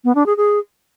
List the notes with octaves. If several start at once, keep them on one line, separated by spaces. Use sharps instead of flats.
B3
D4
G#4
G#4